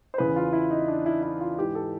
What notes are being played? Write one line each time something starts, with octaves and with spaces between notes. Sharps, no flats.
C5
E2 C#3 E3 B4
F4
E4
D#4
D4
E4
E4
F4
G#2 E3 G4
A4